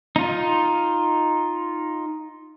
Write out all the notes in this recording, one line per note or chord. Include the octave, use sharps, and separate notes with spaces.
D#4 F4